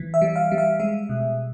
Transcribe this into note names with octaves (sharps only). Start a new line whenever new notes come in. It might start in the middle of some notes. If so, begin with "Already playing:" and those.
Already playing: E3
E5
G3
F5
G3
F5
G#3 E5
B2